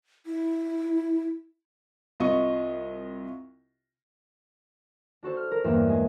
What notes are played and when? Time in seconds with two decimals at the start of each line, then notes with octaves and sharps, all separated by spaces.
0.26 E4
2.20 C2 F4 D#5 C#6
5.23 D4 F#4 A4 C5
5.37 F6
5.51 A#4
5.64 E2 G2 A#3 D4
5.88 G#3 G#4